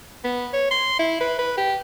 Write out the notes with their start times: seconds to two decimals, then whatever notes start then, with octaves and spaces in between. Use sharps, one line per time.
0.24 B3
0.53 C#5
0.71 C6
0.99 E4
1.20 B4
1.39 B4
1.58 G4